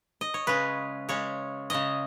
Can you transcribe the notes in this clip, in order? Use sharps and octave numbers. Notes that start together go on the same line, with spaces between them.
D#5
C#5
C#3 G#3 C#4 B4
C#3 G#3 C#4 C#5
C#3 G#3 C#4 D#5